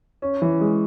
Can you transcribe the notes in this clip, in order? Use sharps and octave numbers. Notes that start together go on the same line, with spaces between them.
C#4
E3
G#3